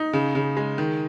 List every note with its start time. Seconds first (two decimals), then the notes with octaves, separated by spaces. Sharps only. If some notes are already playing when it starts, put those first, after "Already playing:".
Already playing: D#4
0.13 C#3
0.35 C#3
0.57 G#3
0.78 D#3